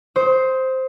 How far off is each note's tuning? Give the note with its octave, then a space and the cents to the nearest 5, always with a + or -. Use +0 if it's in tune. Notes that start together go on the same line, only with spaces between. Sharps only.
C5 +0 D#6 +35